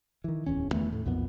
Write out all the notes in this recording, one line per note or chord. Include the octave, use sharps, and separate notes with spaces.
D#3 E3
D1 E2 C#4
E2 D#3 A3 B3
A2
B1 F2 A#2 B3